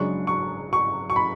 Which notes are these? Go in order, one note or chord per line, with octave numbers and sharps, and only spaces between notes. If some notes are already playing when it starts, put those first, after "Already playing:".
Already playing: F#1 F#2 C#3 G#3 D4 C#6
C#6
C#6
C#6
B5